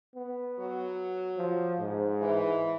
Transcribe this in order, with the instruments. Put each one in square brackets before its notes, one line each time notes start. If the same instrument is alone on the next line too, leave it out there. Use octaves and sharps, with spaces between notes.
[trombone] B3
[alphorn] F#3
[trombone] F3
G#2
[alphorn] E3